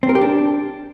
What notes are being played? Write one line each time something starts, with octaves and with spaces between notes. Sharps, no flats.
C4
A#4
G4
D4